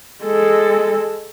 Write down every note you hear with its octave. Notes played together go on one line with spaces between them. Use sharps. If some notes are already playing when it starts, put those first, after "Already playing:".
G#3 A4